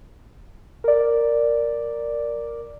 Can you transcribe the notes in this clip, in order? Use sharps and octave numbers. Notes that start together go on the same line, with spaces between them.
A#4 D5